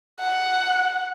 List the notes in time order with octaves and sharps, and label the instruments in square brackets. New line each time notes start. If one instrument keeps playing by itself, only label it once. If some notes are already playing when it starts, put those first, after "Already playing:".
[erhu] F#5